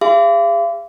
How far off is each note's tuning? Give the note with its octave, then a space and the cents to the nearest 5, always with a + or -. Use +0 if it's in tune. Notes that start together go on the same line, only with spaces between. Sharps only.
G#4 -35 F5 -45 C6 -40